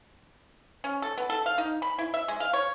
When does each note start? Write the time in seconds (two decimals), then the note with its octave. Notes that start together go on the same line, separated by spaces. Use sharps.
0.84 C#4
1.02 A4
1.18 B3
1.30 A4
1.46 F5
1.58 D#4
1.82 B5
1.99 E4
2.14 E5
2.28 G#3
2.40 F5
2.53 C#5